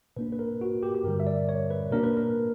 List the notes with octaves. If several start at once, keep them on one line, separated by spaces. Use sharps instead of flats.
B2 A#3 D4 B4
B4
A#4
F#4
G4
G4
G2 D3 G3 A#4
E5
D5
C#5
B4
B2 A#3 D4 A#4
B4
A#4